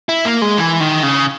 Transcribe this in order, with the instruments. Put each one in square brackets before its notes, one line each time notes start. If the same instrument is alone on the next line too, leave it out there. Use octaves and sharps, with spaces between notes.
[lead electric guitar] E4
A#3
G#3
E3
D#3
C#3